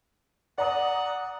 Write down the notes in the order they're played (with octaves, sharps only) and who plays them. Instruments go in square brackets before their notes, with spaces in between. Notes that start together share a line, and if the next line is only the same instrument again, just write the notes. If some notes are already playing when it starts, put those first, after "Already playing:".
[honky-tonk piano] D5 A#5 D#6 [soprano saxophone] F#5